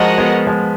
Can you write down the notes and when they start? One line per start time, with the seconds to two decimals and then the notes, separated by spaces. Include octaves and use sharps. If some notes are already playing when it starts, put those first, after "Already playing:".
Already playing: F3 G#3 F#4 A#4 D#5 F#5
0.18 G#3 B3
0.47 F3 G#3